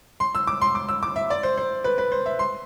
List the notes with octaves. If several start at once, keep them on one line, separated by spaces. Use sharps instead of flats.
C6
E6
D6
C6
D6
E6
D6
E5
D5
C5
C5
B4
B4
C5
E5
C6